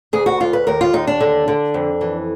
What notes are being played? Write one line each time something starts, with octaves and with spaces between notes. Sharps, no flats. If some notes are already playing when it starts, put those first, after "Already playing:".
D2 G#4
F#4
D2 F4
B4
D#2 A#4
F4
D#2 D#4
D4
D3
D3
F2
E3